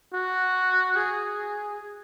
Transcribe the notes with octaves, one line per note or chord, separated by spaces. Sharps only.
F#4
G#4